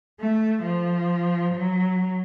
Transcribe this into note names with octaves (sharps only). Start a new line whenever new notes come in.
A3
F3
F#3